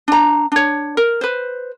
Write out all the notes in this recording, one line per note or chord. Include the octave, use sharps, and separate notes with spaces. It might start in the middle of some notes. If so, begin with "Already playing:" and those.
D4 A#5
D4 C#5
A#4
B4 C5